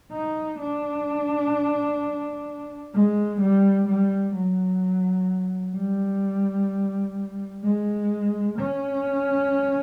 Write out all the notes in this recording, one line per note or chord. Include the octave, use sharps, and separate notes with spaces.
D#4
D4
G#3
G3
G3
F#3
G3
G#3
C#4